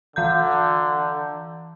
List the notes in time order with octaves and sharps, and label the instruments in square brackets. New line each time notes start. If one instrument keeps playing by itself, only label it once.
[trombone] D3 [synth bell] E3 A#5 G6